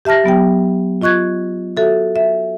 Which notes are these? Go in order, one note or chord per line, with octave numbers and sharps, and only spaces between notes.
G4 E5 A5 F6 A#6
F#3 B3 G4 G5
F4 D#5 C#6 F#6 G#6
F#4 A4 E5
E5